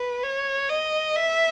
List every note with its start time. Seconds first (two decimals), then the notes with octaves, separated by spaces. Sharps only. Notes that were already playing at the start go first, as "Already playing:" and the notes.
Already playing: B4
0.23 C#5
0.69 D#5
1.16 E5